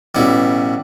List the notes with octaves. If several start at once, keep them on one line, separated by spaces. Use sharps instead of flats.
A1 B2 G3 E4